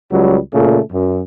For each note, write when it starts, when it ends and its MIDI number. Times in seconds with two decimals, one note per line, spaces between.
0.12 0.37 37
0.12 0.37 54
0.12 0.37 55
0.53 0.79 46
0.53 0.79 49
0.53 0.79 57
0.93 1.21 42